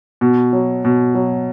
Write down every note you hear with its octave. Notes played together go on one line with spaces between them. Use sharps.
B2
F#3
B2
F#3